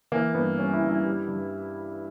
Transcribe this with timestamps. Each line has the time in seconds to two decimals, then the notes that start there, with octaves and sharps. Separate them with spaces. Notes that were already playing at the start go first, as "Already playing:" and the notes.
0.12 E3 A#3
0.34 G2 B3
0.58 G3 C#4
0.73 E4
0.81 G2
0.90 E4
1.05 G3
1.28 G2